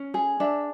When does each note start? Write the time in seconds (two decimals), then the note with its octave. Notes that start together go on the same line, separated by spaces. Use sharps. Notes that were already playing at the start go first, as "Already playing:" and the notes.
Already playing: C#4
0.14 G#4
0.40 D4 E5